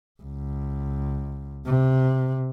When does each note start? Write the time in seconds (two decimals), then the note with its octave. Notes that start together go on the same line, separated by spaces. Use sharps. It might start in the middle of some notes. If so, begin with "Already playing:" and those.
0.22 C#2
1.66 C3